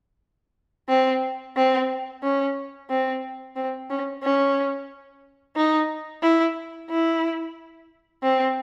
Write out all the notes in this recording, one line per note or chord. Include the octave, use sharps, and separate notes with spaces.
C4
C4
C#4
C4
C4
C#4
C#4
D#4
E4
E4
C4